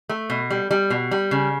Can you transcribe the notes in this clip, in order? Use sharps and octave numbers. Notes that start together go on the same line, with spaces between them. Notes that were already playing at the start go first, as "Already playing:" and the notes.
A3
B2
G3
G3
B2
G3
C#3